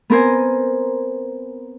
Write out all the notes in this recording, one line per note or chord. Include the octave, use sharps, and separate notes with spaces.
B3 C4 A#4 C5 G#5